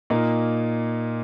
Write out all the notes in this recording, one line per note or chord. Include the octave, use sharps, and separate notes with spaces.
A#2 A#3 D#4